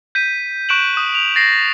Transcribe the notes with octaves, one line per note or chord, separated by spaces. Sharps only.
G6 B6 D#7
C#6 F#6 D7 E7 F#7
D#6
F7
A6 A#6 C7